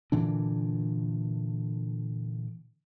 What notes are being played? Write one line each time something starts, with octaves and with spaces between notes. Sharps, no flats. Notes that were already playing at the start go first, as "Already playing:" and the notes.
A#2 D3 E3 D4